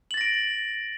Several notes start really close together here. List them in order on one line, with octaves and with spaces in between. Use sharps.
F#7 A6 A#6 D7